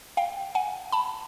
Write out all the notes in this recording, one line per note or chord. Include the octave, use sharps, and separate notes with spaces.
F5 G5
F#5 G#5
A5 B5